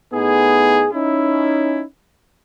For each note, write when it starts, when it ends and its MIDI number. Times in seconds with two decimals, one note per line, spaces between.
0.12 0.87 45
0.12 0.87 59
0.12 0.87 63
0.12 0.87 68
0.93 1.83 61
0.93 1.83 63
0.93 1.83 64